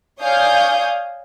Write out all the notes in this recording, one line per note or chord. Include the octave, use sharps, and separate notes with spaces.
C#5 D5 F5 G#5 D#6 G6